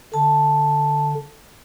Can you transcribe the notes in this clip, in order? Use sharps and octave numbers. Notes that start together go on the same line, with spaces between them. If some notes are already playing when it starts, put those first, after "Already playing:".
D3 A5